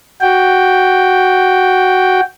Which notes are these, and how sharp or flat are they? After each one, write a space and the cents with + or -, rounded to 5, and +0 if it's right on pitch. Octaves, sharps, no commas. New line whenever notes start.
F#4 +5 G5 +0